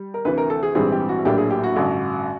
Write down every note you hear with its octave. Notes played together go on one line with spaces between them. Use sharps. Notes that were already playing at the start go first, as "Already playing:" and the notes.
Already playing: G3
A#4
D2 C3 E3 B4
A#4
A4
G#4
A#1 G#2 E3 G3 C4 G#4
G4
F#4
A#1 A2 F#3 A#3 D4 G4
G#4
G4
F#4
A1 G2 D3